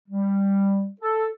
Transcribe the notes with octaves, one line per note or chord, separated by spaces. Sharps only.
G3
A4